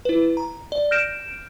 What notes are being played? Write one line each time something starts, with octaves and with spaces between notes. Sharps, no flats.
E4 B4
A#5
D5
F6 G6 A#6 D7 E7